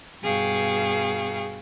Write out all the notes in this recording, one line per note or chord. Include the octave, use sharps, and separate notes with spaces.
G2 B2 G#4 F5 G5 C#6